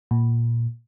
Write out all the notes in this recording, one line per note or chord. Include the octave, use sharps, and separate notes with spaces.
A#2